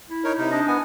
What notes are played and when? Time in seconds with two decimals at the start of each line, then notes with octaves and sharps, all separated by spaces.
0.10 E4
0.24 D#4 A#4 C#5
0.38 C3 D#4
0.51 D4 D#5
0.68 B3 G#5